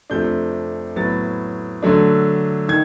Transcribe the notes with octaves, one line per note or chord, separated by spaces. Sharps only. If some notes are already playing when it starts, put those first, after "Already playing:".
F2 C3 F3 A3 D4 G6
A2 F#3 B3 A6
D3 F#3 A3 D4
D#3 G#6